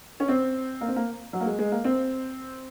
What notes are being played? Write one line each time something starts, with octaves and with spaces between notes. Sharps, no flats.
C#4
C4
A#3
C4
A#3
F#3
A#3
G#3
G#3
A#3
C4